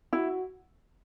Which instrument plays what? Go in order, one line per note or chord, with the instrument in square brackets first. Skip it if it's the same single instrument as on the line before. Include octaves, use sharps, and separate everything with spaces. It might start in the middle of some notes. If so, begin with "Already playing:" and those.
[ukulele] E4 [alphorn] F#4